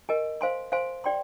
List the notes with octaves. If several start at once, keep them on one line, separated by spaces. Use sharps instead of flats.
G4 A#4 D#5 G#5
C5 F5 G#5 C6
C5 F5 G#5 C6
G4 D5 G5 C6